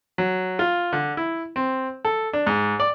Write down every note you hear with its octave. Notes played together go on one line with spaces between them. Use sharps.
F#3
F4
D3
E4
C4
A4
D4
G#2
D5